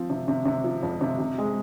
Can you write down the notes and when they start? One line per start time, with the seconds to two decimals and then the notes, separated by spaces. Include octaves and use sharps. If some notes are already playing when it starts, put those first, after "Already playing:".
Already playing: F3 C4
0.10 C3
0.28 C3
0.45 C3
0.64 F3
0.83 F2
1.01 C3
1.19 C3
1.38 G#3